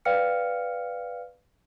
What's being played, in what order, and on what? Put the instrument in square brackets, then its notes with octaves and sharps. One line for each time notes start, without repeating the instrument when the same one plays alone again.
[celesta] B4 D5 F5 G5 F6 C#7